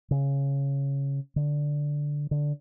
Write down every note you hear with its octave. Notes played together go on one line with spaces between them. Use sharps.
C#3
D3
D3